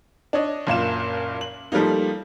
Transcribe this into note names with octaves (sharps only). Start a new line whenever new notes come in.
D4 C#5 D#5
F#1 A#2 F4 E7
F#7
F3 G3 A3 A#3 D#4